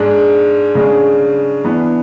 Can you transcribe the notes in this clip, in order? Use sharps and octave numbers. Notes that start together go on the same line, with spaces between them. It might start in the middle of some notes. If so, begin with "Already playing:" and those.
Already playing: G#2 G#3 D4
C#3 G#3 D4
E3 B3 D4